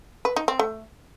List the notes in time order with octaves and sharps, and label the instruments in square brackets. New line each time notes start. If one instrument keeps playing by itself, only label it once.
[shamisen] B4
D#4
C4
A3